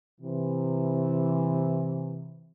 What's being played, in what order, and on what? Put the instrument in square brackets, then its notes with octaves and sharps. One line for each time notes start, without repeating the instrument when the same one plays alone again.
[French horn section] C3 E3